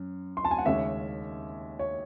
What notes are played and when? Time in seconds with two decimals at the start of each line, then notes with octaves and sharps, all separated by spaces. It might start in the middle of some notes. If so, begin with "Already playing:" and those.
Already playing: F#2
0.37 C6
0.45 A5
0.51 G#5
0.58 F#5
0.66 D#2 C#3 G#3 C#4 E5
1.79 C#5